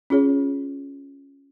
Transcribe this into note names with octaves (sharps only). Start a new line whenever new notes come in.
C#4 F4 G#4 C#5